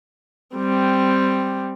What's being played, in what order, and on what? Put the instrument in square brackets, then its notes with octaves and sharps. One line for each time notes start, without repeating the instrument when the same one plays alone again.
[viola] G3 C4